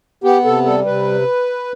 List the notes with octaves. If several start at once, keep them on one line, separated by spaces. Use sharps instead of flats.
B3 G4
C3 A4
G3 A4
C3 B4